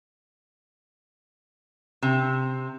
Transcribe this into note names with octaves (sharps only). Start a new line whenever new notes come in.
C3